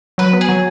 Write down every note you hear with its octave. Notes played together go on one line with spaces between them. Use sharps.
F#3 B4
B3
G#4
F#3